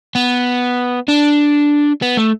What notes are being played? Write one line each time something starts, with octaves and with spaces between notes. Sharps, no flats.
B3
D4
B3
A3